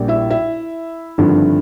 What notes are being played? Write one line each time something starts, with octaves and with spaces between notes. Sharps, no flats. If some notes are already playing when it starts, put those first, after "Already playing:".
Already playing: A#1 A#2 G3
E4 E5
E4 E5
G#1 G2 D3 F3